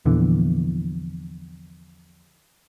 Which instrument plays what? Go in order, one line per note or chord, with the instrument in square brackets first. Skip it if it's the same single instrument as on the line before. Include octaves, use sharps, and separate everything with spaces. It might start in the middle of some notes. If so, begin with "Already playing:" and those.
[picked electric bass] A#1 E2 D3 E3